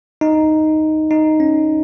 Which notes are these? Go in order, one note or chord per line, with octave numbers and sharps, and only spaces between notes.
D#4
D#4
C#4